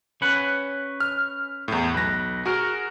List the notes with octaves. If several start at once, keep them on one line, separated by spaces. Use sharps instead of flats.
C#4 B4 F#5
F6
E2 A2
B1 B4 A#6
F#4 G#4 A#4